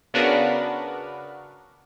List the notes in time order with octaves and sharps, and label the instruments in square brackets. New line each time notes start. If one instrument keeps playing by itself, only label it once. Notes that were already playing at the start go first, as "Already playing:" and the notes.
[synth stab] C#3 B3 D4 F#4 A#4 B4